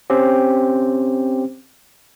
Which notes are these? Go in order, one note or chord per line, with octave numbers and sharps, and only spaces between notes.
C4 C#4 G4